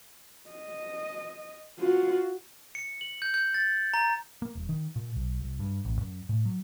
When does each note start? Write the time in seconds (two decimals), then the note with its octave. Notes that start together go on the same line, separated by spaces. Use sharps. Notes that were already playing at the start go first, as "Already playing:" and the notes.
0.50 D#5
1.79 F4 F#4
2.75 C#7
3.01 F#7
3.22 G6
3.34 G6
3.54 A6
3.94 A#5
4.42 A#3
4.55 D#1
4.69 D#3
4.96 A#2
5.16 B1
5.41 C2
5.60 G2
5.85 A1
5.99 F#2
6.29 A2
6.45 F#3